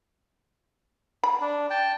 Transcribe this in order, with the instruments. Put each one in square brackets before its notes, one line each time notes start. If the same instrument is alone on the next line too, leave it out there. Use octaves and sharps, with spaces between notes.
[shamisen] B5
[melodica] D4
G5 A5